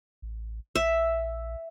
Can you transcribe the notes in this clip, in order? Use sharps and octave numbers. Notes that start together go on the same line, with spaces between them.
A1
A#1 E5